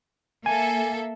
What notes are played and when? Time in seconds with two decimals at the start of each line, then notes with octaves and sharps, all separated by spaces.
0.46 A#3 A4 E5 G#5